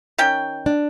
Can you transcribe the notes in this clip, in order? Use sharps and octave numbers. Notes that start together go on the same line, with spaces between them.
D#3 C#4 G5
D4